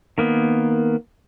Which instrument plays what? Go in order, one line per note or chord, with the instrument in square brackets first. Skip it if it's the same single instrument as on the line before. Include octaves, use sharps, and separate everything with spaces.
[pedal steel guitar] D#3 A#3 B3